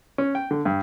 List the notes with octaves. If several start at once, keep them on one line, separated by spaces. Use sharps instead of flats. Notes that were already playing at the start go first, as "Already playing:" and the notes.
C#4
G5
D3
G2